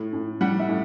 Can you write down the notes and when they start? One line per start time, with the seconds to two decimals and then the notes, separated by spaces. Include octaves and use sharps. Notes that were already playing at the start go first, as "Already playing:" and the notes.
Already playing: A2
0.13 A2
0.41 G3 F#5
0.60 E5
0.69 A2